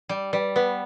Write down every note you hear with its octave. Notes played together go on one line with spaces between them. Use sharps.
G3
G3 B4
B3 B4